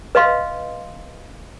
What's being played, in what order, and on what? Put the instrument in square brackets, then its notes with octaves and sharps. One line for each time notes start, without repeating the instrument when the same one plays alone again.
[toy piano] B4 D#5 F5 C6